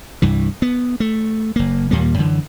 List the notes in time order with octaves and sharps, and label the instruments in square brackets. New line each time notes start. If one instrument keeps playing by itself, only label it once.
[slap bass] C2 G2 E3
B3
A3
F#1 A#3
D#2 A#2 G3 A#3
F#2 D3 E3